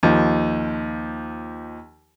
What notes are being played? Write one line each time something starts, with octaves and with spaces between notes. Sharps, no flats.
D#2 F3